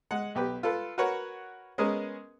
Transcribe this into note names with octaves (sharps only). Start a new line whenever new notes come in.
G#3 F#5
B1 G4 B4
F4 A4 B4
F#4 A#4 B4 C#5 F#5
G#3 B3 C#4 G#4 A#4